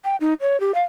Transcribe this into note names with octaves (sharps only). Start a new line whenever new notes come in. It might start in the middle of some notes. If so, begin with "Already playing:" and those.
G5
D#4
C#5
G4
F5